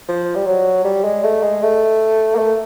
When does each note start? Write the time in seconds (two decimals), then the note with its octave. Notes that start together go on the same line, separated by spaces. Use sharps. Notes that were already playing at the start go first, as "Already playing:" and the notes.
0.09 F3
0.36 G3
0.46 F#3
0.85 G3
1.04 G#3
1.24 A3
1.43 G#3
1.63 A3
2.35 A#3
2.39 A3